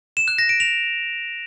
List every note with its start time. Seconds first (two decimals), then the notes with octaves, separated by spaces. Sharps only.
0.17 E7
0.28 F#6
0.38 A#6
0.49 D7
0.60 F7